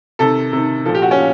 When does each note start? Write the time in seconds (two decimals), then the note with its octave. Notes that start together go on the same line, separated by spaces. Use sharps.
0.19 C3 D#3 A4
0.53 C3 D#3
0.86 A#2 F3 A4
0.95 G4
1.02 F#4
1.11 C#4
1.18 A#2